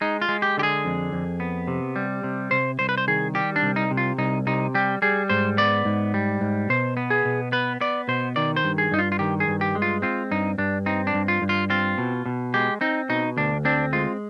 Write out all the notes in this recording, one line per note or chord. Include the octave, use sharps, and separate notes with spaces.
G#3 D#4
F4
G#3
G4
D3 G4
G#4
F2
F2
B3
C3
G3
C3
C3 C5
C2 C5
B4
C5
D#3 G#4
G3 G4
D4
C2
D#4
C3
F4
C2 D#4
C3 D#4
G3 G4
G3 G#4
G#2 C5
B3 D5
G#2
G3
G#2
B2 C5
B3
G#4
B2
B3 B4
B3 D5
B2 C5
D#3 D5
C5
G2
G#4
G2 D#4
F4
F4
D#3 G4
G#4
G2
G4
G#3
F4
C4 F4
G2 D#4
G2 D4
C4 D#4
D4
G2
F4
G2
F4
C4 F4
B2
B2
G#3 G4
C4 D#4
B2 D#4
D2 D4
C4 D4
G#3 F4